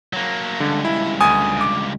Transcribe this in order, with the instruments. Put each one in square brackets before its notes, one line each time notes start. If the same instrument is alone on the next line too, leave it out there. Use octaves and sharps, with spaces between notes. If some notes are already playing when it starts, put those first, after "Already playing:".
[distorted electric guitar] F#3 A#3
[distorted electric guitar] C#2 G2 [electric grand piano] D3
[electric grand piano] E4
D2 G#5 D#6
D6